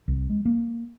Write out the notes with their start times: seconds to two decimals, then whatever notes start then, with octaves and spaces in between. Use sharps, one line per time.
0.08 C2
0.30 G#3
0.45 A#3